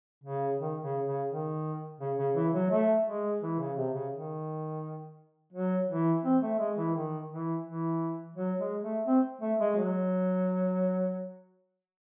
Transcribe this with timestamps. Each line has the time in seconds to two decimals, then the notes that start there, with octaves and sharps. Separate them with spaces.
0.24 C#3
0.60 D#3
0.82 C#3
1.06 C#3
1.30 D#3
2.00 C#3
2.18 C#3
2.35 E3
2.54 F#3
2.70 A3
3.06 G#3
3.42 E3
3.59 C#3
3.77 C3
3.94 C#3
4.12 D#3
5.53 F#3
5.88 E3
6.24 C4
6.42 A3
6.59 G#3
6.77 E3
6.94 D#3
7.30 E3
7.65 E3
8.36 F#3
8.59 G#3
8.83 A3
9.06 C4
9.41 A3
9.59 G#3
9.76 F#3